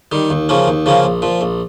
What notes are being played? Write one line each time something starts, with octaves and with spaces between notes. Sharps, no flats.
D#3 G3
D#2
C#3 F3 A#3 C#4
D#2
C#3 F3 A#3 C#4
A#1
A#2 F3
A#1